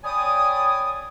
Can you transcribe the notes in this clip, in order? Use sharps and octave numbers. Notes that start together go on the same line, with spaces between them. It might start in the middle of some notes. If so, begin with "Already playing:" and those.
C#5 D5 G5 G#5 B5 D#6